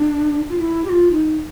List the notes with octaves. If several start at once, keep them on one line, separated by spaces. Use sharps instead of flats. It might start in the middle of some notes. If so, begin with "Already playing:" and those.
Already playing: D4
F4
E4
G4
F4
D#4